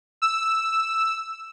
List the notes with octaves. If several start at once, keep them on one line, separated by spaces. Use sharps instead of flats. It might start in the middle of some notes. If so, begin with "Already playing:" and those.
E6